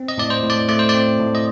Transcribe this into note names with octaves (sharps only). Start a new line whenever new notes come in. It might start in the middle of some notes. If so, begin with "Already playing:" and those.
Already playing: C4
D#5
A2 D5
C5
A2
D5
A3 D5
C5
D5
C4
A2
D#5